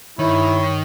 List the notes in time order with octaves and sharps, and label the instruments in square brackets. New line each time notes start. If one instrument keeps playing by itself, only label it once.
[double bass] G2 [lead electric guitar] D#3 [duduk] E4 [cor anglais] C#5